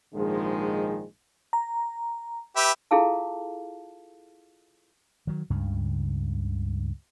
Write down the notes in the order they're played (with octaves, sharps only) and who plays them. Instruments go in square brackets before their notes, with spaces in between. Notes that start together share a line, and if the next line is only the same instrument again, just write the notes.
[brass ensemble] A#1 G#2 D#3 F3 G#3
[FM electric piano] A#5
[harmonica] G4 B4 E5
[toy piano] E4 F4 G#4 A4 F5 A5
[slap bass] D#3 F#3
C#2 G2 C#3